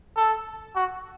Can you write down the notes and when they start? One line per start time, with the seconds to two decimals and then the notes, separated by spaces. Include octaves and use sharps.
0.16 A4
0.75 F#4